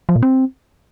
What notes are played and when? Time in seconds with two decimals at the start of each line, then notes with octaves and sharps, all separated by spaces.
0.09 F3
0.16 A#2
0.23 C4